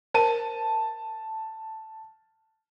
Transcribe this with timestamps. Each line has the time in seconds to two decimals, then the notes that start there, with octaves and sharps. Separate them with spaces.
0.14 A#4 C5 A5 D#7